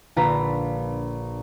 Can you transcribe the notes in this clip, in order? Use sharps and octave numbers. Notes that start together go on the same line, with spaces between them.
A#1 D3 F4 B4 A#5 B5